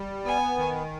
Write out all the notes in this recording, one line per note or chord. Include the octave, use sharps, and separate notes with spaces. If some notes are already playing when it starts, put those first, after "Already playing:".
Already playing: G3
B3 G#5
D#3